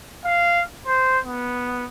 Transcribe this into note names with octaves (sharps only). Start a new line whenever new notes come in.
F5
C5
B3